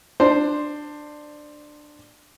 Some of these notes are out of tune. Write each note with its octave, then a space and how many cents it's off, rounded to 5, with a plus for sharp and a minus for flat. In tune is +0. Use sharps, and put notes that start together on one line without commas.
D4 +15 C5 +0